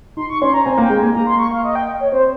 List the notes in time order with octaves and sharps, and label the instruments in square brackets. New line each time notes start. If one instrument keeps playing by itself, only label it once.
[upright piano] D#4 [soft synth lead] C6
[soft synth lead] C#6
[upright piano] C#4 [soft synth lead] C6
[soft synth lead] A#5
[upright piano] C4 [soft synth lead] G#5
[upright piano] A#3
[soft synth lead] G5
[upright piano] G#3
[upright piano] A#3 [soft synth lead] G#5
[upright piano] A#3 [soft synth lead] A#5
[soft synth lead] C6
C#6
F5
D#5
G5
C#5
[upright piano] C4 [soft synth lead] C5